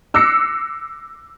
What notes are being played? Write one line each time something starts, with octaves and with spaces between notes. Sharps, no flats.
D6 E6 F#6 A#6 C7 C#7